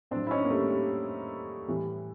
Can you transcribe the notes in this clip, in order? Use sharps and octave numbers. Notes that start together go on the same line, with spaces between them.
A2 F#3 C4 D4
E4
C#4 D#4
A#3
G3 A3
G3
A2 E3 G3